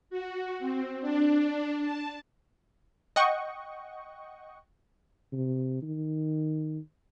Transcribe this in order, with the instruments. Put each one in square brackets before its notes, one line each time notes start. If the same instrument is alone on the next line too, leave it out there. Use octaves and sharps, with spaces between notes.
[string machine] F#4
C4
D4
A5
[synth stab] D#5 F#5 G5 C#6
[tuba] C3
D#3